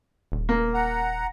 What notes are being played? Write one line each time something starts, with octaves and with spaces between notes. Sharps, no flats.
D#1
A#3
F#5 A#5